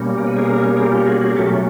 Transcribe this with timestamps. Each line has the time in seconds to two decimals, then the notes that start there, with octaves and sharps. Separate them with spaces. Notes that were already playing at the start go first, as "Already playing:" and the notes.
Already playing: B2 G3 A#3 C#4
0.18 A#4
0.27 B4
0.37 G#4 A#4
0.76 G#4 A#4
0.92 F4 G4
1.06 F#4 G#4
1.21 F#4 G#4
1.29 A#4
1.36 B2 F#3 A3 C#4 G4 A4